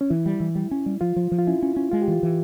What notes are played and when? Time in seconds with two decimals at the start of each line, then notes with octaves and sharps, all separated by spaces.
0.01 C#4
0.10 E3 E4
0.26 G3
0.40 E3
0.55 G3
0.71 C#4
0.86 G3
1.01 F3 F4
1.16 F3
1.32 F3
1.39 F4
1.47 C#4 E4
1.62 C#4
1.76 C#4
1.92 G#3 F4
2.02 G4
2.08 E3 F4
2.23 E3